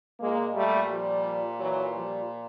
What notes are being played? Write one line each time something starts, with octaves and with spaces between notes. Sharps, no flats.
A#2 G#3 A#3
G3 A3
F3 G3
E3 F#3
F3 G3